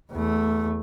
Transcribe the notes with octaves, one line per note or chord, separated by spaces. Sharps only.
E2 A3